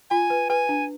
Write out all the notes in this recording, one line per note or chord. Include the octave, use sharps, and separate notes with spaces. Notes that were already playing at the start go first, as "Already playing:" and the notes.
F4 G#5
B4
B4 G#5
D4